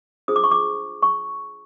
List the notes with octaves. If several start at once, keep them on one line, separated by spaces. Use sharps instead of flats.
D4 F4 G#4 C5 D#6
D6
C#6
D6
C#6